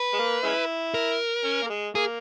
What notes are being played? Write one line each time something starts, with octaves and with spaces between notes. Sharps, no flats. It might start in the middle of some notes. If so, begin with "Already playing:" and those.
Already playing: B4
G#3
A#3
G#3 C#4 E4
A#4
C#4
A#3
G#3
A#3 G#4